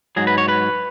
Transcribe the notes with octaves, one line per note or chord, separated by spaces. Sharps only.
G#2 F#3 G#4
B4
C#5
B4